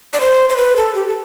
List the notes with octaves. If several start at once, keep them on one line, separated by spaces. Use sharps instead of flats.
D5
C5
C5
B4
A4
G4
A4